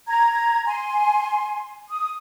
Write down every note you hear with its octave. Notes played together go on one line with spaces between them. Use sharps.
A#5 G#6
G#5 C6
D#6